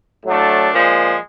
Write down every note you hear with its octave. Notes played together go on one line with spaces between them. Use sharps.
A2 F#3 A3 D4
A#2 F3 G#3